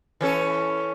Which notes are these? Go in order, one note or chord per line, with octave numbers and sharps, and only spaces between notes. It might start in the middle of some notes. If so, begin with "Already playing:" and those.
E3 C#4 A4